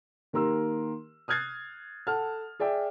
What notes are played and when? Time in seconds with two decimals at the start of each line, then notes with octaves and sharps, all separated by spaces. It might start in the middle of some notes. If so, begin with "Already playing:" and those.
0.33 D#3 A#3 G4 A#4 C6 E6
1.28 D#6 F6 F#6 G#6 A6 C7
2.07 A4 F#5 A5 F6
2.60 G#4 D5 E5 G5